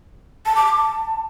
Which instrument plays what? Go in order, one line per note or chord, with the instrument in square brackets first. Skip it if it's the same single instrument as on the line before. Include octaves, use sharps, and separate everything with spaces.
[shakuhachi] A5
D6
D6
A5